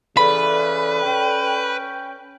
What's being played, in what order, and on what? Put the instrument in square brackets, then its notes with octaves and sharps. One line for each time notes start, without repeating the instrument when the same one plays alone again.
[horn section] C#3 E3 [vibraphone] A4 D5 [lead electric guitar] B4 [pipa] B5
[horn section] C#4 G5